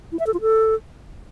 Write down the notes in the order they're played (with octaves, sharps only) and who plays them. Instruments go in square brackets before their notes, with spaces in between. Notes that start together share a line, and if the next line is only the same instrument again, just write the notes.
[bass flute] E4
E5
A4
F4
A4